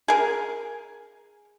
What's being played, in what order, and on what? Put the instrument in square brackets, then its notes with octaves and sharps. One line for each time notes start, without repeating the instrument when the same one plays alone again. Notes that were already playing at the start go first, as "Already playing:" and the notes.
[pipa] G#4 A#4